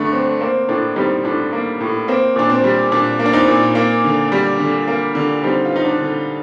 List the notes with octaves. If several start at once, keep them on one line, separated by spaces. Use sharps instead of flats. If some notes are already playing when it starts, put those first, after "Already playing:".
Already playing: G2 D3 A3 D4
C4
A#3 C4
A2 D4
G3 C4 D#4
A2 D4
A#3
A2
A#3 C4
A#2 D4
C4
G3
A#2 D4
A#3
D4
C4 D#4
A#2
A#3
D3
G3
D3
A#3
D3
G3 C4 D#4
F4
C4 D#4
D4
D3